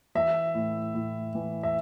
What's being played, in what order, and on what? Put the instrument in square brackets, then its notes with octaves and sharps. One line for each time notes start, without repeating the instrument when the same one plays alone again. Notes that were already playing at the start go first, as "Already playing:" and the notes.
[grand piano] E3 E5
A2
A2
E3
E5